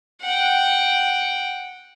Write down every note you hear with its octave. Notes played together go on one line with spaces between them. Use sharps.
F#5 G5